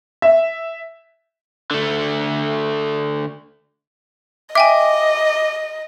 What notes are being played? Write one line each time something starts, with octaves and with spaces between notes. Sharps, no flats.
E5
D3 A3
D#5 E5 G5 G#5 D6